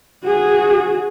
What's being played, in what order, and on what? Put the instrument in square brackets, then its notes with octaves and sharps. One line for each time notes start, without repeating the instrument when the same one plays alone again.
[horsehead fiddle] F#4 G#4